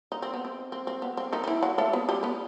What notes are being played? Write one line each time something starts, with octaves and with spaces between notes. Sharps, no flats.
D#4
C4
B3
C4
C4
C4
B3
C4
D#3 D#4
D#4
E3 E4
F#3 F#4
A3 A4
B3 B4
G3 G4
B3 B4